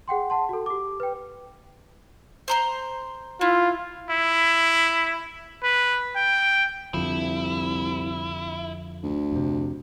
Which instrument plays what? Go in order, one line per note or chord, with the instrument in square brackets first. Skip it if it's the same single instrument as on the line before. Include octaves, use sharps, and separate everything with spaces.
[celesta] G#4 F#5 G5 C6
F#5 A5 C6
F#4 A4
G4 D6
B4 G5
[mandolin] C5 A#5 C6
[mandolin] E4 [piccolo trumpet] F4
[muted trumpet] E4
B4
G5
[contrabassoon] C2 [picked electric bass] F2 D3 F3 [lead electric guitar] E4
[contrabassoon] D2
[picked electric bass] F2 C3